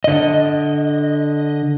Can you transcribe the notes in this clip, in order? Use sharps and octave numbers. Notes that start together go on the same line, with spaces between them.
D3 D#5